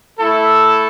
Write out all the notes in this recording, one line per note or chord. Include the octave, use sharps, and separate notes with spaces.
A3 E4 A4